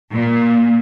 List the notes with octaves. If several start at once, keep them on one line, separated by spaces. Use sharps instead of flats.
A#2